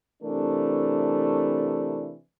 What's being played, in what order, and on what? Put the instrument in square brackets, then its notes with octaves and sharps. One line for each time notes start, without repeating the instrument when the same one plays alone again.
[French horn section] C3 E3 A3 D4 A#4